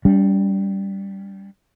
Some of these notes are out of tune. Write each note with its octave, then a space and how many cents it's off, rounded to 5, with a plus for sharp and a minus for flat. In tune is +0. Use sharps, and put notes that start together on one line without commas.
G3 +0 C#4 +45